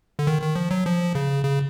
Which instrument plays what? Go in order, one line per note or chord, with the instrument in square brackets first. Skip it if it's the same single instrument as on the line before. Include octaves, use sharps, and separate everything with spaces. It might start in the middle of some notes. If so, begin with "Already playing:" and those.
[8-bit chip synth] D3
D#3
D#3
F3
F#3
F3
C#3
C#3